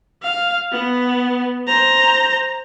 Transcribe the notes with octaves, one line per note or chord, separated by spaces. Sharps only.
F5
B3
C5 A#5